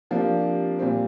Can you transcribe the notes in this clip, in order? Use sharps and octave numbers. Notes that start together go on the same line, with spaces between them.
C3 F3 A#3 D4
A#2 G3 C4